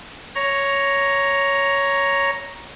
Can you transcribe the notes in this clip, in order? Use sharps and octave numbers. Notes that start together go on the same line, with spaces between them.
C#5 A#5